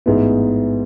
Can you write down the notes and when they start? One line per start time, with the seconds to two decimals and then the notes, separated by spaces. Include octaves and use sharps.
0.06 A1 G#2 G#3 B3 E4